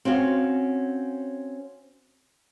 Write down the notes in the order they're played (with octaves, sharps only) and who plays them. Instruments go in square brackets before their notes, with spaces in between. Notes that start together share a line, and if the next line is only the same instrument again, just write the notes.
[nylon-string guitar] C4 C#4 F#4 F5